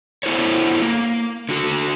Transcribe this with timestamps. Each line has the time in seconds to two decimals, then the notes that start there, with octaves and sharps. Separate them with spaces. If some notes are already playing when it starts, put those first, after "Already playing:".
0.23 B3 D4 E4 A4 C5 C#5
0.82 A#3
1.49 D3 F#4 A4